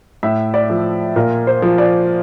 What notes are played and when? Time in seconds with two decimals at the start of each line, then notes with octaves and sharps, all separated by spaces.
0.23 A2 E5
0.54 D5
0.70 F3
1.16 A#2 A#4
1.47 C5
1.62 F3
1.78 D5